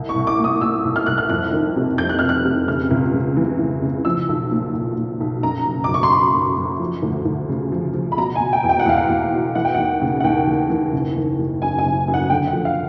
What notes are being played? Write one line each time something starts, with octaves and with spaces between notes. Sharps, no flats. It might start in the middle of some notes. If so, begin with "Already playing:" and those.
Already playing: C2
C#6
C2
D6
A#2
D#6
A#2 E6
C2
F6
C2 F#6
F6
F2 F#6
D#3
C3
F2 G6
F#6
F1 F6
F#6
C3
C#3 F6
C#2
C#3
E3
E3
C#3
F3 E6
B1
A#2
B1
A#2
B1
F#2 A#5
F#1
F#2 D6
C#6
C6
F#2 B5
F#2
F#2
F3
D2
D2
C#3
F3
F3
B5
B2 A#5
G#5
B2
G5
E2
G5
F#5
E2 F5
F#5
E2
B2
E3 F#5
G5
D#2 F#5
C#3
F#5
D#2 G5
E3
E3
F#1
D#3
F#1
F#2 G#5
G#5
F#1
F#2
F#5
D3 G5
F#5
F3
F5